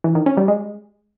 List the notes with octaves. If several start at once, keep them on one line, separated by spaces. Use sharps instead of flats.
E3
D#3
C#4
G3
G#3